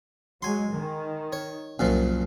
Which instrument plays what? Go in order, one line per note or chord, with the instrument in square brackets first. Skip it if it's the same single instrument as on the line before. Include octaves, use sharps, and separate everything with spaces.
[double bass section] F#3 G#3 [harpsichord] G#5 C6
[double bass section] D#3
[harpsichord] C#5
[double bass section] C2 [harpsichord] F#2 A#2 F3